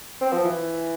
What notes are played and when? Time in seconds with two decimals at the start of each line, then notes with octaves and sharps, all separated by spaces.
0.21 C4
0.33 F3
0.45 E3